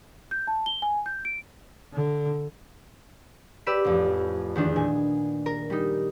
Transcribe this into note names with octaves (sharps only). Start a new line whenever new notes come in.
G6
A5
G7
G#5
G6
D7
D3
G4 B4 D5 E6
A1 F2
E2 D#3 D4
A#2 G#5
A#4
G3 D#4